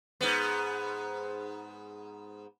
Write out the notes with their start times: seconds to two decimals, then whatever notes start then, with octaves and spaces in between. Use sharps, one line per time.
0.21 G#2 B3